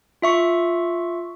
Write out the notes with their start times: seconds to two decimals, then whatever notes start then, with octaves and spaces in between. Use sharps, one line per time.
0.22 F4 E5 C#6